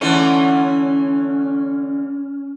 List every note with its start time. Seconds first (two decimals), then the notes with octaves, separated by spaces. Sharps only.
0.01 D3 E3 A3 C#4